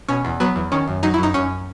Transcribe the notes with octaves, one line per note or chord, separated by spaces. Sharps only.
B2 C#4
E2
F#3 B3
E2
D#3 C#4
F#2
F#3 D#4
E4
F#2 D#4
F#2 C#4